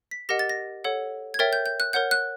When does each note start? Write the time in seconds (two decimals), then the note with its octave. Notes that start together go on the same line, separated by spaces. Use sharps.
0.11 B6
0.29 G4 A#4 D#5 F#5 A#6
0.39 A6
0.49 A#6
0.84 A4 C#5 F#5
1.34 G#6
1.39 A#4 C#5 E5 G5 A6
1.53 G6
1.66 G6
1.80 F#6
1.93 A#4 C#5 F#5 G6
2.11 F#6